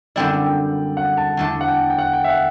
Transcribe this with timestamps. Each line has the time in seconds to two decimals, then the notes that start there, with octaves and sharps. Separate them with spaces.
0.16 F#2 D3 G3 C4 E4 D5
0.47 G5
0.97 F#5
1.17 A5
1.37 E2 D3 A3 A5
1.61 F#5
1.68 G5
1.90 G5
1.98 F#5
2.13 G5
2.24 E5
2.29 F#5